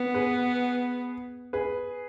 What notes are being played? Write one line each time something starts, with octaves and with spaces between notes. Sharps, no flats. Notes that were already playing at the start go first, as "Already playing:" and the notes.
Already playing: B3
G#4 B4
G#4 B4